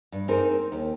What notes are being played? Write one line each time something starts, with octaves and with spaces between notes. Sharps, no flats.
G2
C4 D#4 G#4 A#4 C5
D#2